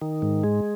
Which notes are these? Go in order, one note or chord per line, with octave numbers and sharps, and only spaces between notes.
D#3
G#2
G#3